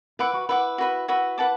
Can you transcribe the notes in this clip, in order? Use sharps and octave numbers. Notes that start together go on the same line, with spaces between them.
E4 B4 F#5 D6
F#4
E4 B4 F#5 D6
F#4 B4 E5
F#4 B4 E5
B4 F#5 A5 D6